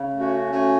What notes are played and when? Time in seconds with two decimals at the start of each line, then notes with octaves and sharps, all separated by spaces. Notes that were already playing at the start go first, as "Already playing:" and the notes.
Already playing: C#3
0.15 A3 C#4 F#4
0.52 A3 C#4 F#4